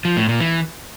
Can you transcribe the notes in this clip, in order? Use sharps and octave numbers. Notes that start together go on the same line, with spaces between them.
F3
A2
A#2
E3